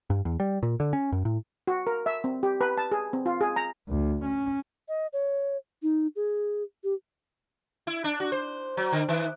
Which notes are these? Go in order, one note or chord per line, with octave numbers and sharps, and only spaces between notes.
G2
E2
G3
A#2
D3
C#4
F#2
A2
F#4
A#4
E5
C4
G4
B4
A5
G#4
C4
F4
G#4
A#5
D2
C#4
D#5
C#5
D#4
G#4
G4
E4
D4
F#4
C5
F#3
D3
D#3